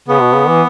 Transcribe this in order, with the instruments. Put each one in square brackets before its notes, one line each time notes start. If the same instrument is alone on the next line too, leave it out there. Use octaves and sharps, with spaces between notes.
[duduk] C#3 [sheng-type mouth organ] B3
[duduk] B2
C#3
E3